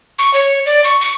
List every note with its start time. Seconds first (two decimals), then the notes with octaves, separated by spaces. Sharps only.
0.19 C#6
0.34 C#5
0.66 D5
0.84 C#6
1.01 C#6